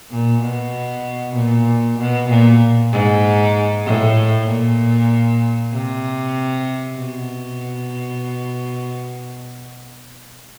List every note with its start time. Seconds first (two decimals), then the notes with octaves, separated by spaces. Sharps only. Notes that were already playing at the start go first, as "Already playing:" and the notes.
0.11 A#2
0.41 B2
1.35 A#2
1.98 B2
2.29 A#2
2.92 G#2
3.85 A2
4.47 A#2
5.72 C3
6.97 B2